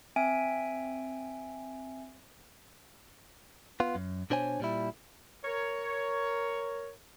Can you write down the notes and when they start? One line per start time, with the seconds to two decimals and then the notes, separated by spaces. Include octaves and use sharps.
0.16 C4 E5 G#5 D7
3.80 B3 F4
3.95 F#2
4.30 B2 D4 C5 C#5 G#5
4.60 A#2 G3 E4
5.44 A#4 C#5